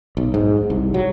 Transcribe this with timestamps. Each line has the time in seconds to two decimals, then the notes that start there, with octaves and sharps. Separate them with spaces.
0.17 B1
0.34 G#2
0.70 C2
0.94 F#3